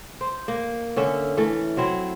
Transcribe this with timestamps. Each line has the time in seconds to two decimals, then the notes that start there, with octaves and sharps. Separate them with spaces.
0.21 C5
0.48 A#3
0.96 D3 C#4 E5
1.37 E3 A3 C#4
1.77 F#3 C4 E4